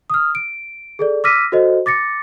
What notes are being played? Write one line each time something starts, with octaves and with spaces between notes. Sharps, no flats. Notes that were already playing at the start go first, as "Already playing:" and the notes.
D#6 F6
D7
G#4 A4 D5
D6 E6 F6 A#6 B6 D#7
F#4 A4 C5 D#5
D6 A6 A#6 C#7